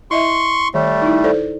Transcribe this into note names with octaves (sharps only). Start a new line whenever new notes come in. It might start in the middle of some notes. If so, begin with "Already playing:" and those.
E4 D#5 E5 C6 C#6
D#3 G3 A3
D#4 E4
A4 C5 D5